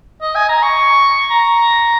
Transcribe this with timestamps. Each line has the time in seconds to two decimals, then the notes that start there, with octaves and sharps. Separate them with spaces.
0.22 D#5
0.36 G#5
0.49 A#5
0.62 C#6
1.30 A#5